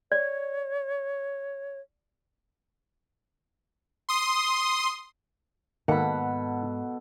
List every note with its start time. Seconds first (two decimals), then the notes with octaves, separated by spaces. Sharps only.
0.12 C#5 D5
4.09 C6 D#6
5.88 G#2 B2 D#3 A#3 A4 F#5 B5